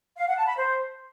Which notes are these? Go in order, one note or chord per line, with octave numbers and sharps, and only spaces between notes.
F5
F#5
A5
B5
C5